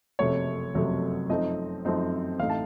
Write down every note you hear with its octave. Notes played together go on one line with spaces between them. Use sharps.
F#1 F2 C3 F#3 A3 C#5
F#1 F2 C3 F#3 A3
F#2 F3 A3 C4 D#4 D#5
F#2 F3 A3 C4 D#4
A1 A2 A3 D#4 F5
A5